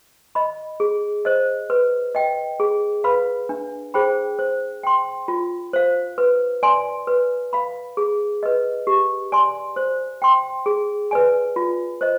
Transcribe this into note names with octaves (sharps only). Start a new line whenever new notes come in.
D#5 B5
G#4
C5 D#5
B4
D#5 G5
G#4
B4 F5 B5
D4
G#4 C5 G5 B5
C5
G5 C6
F4
C5 F5
B4
D5 G#5 C6
B4
F5 B5
G#4
B4 D#5
G4
D5 G#5 C6
C5
G5 C6
G#4
B4 D5 G#5
F4
C5 D#5